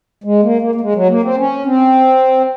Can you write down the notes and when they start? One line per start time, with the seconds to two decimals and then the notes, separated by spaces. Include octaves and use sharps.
0.24 G#3
0.43 A#3
0.62 A#3
0.75 A#3
0.81 G#3
0.95 F#3
1.09 A#3
1.23 C4
1.37 C#4
1.66 C4